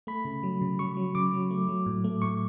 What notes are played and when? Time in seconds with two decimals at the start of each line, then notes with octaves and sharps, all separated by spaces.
0.07 A3 B5
0.25 C#3
0.43 F#3
0.61 C#3
0.79 F#3 C#6
0.97 F#3
1.15 C#3 D6
1.33 F#3
1.51 A3
1.69 F#3
1.86 A2
2.04 A3
2.22 A2 C#6